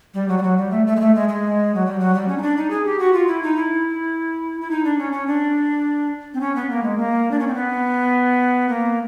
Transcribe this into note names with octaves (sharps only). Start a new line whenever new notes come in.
G3
F#3
G3
F#3
G3
A3
A3
G#3
A3
G#3
G#3
F#3
G3
F#3
G3
C#4
D#4
D4
D#4
G#4
G4
F#4
F4
E4
D#4
E4
E4
D#4
D4
C#4
C#4
D4
C4
C#4
B3
A#3
G#3
A#3
D4
C#4
C4
B3
A#3